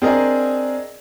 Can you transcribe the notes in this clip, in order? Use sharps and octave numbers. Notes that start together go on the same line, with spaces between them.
C4 D4 G#4 A#4 D#5